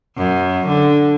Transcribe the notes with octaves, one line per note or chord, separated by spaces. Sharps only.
F#2
D3